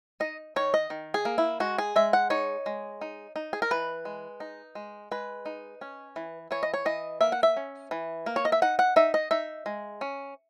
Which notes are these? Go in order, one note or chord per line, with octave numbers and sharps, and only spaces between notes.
D#4 D#5
D#3 C#5
D#5
D#3
G#4
A#3
E4
G#3 F#4
G#4
G#3 E5
F#5
D#4 C#5
G#3
D#4
D#4
G#4
A#4
E3 B4
G#3
D#4
G#3
G#3 B4
D#4
C#4
E3
E3 C#5
D#5
C#5
E3 D#5
A#3 E5
F#5
E5
C#4
E3
A#3
C#5
D#5
E5
D#4 F#5
F#5
D#4 E5
D#5
D#4 E5
G#3
C#4